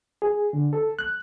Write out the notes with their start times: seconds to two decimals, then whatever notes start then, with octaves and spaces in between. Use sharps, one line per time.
0.22 G#4
0.53 D3
0.73 A4
0.99 F#6